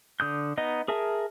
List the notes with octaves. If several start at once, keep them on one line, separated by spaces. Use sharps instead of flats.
D3 D#6 G6
B3 D#4 D#5
G#4 A#4 E5 A5